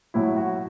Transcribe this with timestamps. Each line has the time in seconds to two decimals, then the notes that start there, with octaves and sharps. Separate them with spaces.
0.14 A2 F#3 E4
0.37 F#4